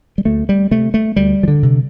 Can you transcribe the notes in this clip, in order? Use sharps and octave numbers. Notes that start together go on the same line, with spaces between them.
G3
D2 A3
G3
C3 A3
A3
D2 G3
F3
D3
C3